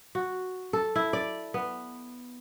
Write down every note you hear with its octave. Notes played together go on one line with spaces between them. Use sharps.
F#4
A4
E4
D5
B3